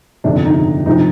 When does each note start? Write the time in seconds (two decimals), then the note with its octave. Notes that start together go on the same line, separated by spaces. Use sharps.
0.24 G1 F2 C3 D#3 D4
0.45 D#4
0.86 D2 C3 F3 D#4